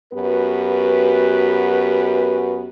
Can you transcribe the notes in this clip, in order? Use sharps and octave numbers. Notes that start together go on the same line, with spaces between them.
F#2 B3 F#4 G4 B4